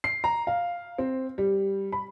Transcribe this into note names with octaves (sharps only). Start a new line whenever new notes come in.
C7
A#5
F5
C4
G3
B5